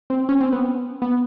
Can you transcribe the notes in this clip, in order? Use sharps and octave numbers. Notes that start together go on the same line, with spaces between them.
C4
C#4
C4
B3
B3